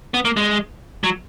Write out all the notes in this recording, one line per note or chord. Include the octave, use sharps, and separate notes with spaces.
B3
A#3
G#3
F#3